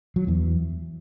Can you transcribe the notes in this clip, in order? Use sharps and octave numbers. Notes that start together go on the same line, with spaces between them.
F#3
E2 E3